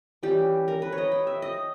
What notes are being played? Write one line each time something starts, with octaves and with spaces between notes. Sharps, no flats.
E3 G3 C#4 G4
A#4
B4
C#5
D#5
G5
E5
D#5